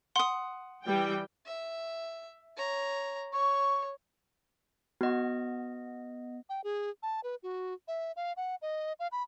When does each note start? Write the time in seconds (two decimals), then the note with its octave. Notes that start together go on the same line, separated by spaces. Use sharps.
0.16 F#5 C6 D#6
0.85 E3 G3 G5
1.46 E5
2.57 C#5 A#5
3.33 C#5 C#6
5.01 B3 F#4 D#5
6.49 G5
6.64 G#4
7.03 A5
7.24 B4
7.43 F#4
7.88 E5
8.16 F5
8.37 F#5
8.62 D#5
9.00 F5
9.12 B5